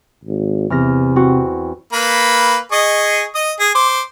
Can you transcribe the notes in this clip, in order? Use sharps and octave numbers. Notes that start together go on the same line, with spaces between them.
G#1
E2 C3 F6 A#6
C4 F#4
A#3 B4 B5
G#4 D#5 C#6
D#5 D#6
G#4
C5 D6